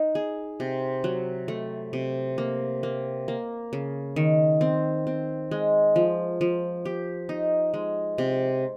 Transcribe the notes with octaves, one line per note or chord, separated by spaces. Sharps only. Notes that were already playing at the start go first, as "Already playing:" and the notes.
Already playing: D#4
G#4
C3
F#3
A3
C3
A#3
A#3
A#3
C#3
D#3
C4
C4
G#3
F3
F3
G4
D#4
G#3
C3